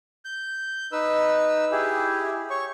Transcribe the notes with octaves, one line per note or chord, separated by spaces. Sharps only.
G6
D#4 B4 E6
E4 G4 G#4
C#5 C#6